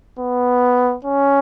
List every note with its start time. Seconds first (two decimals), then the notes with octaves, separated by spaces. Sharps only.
0.19 B3
1.05 C#4